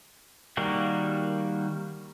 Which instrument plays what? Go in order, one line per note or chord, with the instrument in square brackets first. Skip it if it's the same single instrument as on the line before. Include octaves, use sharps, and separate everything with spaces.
[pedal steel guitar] D#3 G3 A#3 F#4